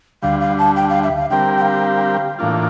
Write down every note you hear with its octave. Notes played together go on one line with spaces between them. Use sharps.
D2 D3 G3 F5
F5
A5
G5
F5
E5
F5
D3 G3 C4 G4 A#4 G5
G5
F5
A2 E3 A#3 D4 F4